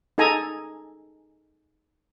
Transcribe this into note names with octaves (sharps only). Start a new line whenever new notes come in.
D#4 G#4 A4 G#5 A#5